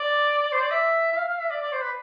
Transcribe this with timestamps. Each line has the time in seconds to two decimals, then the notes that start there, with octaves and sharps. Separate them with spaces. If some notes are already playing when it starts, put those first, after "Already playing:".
Already playing: D5
0.52 C5
0.62 D5
0.71 E5
1.12 E5
1.16 F5
1.28 F5
1.40 E5
1.51 D5
1.62 D5
1.72 C5
1.82 B4